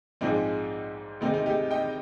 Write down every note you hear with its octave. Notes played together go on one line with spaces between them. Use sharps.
A#1 G#2 F3 G#3 C4 D#4
D2 C3 D#3 G#3 C4 D#4
C4 D#4
D#4 G4
D#5 G5